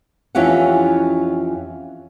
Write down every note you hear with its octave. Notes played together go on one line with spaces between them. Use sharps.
F2 E3 C#4 F4 G4 F#5